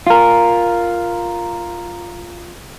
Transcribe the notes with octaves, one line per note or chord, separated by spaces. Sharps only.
F4 A#4